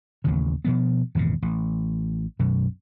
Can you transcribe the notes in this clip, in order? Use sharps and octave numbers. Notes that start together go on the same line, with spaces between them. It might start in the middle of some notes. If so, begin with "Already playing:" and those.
A1 D#2 C#3
B2 F3 B3
G#1 E2 A#2 C#3
A1
B1 F#2 B2